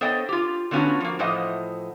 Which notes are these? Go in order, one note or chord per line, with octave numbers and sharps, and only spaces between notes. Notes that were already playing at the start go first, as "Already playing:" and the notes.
B3 A4 C5 C#5 D#5 G5
F4 G4
D3 A3 B3 C#4 F4 F#4
F3 A#3
A2 E3 F3 C5 D#5 F#5